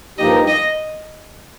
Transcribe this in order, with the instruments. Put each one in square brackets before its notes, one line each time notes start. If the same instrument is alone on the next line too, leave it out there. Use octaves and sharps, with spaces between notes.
[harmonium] G2 F3 A#3 D#4 G4 [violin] D#5
[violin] D#5